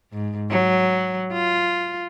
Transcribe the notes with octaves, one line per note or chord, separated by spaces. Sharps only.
G#2
F#3
F4